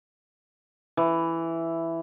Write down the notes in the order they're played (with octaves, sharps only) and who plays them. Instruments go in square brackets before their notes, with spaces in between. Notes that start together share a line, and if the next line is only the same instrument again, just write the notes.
[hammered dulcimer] E3